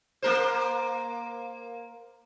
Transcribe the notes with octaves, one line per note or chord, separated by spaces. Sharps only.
A#3 A#4 C5